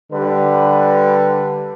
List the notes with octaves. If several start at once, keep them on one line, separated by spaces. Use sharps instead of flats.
D3 G3 B4